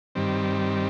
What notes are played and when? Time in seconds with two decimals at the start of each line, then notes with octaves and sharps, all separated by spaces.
0.15 G2 D#3 G3 C4